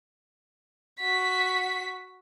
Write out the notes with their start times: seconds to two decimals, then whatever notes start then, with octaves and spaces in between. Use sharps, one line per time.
1.00 F#4 B6